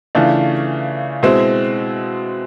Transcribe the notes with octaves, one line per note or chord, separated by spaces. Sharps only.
C#3 E3 A3 D4 F4
B2 G#3 C4 E4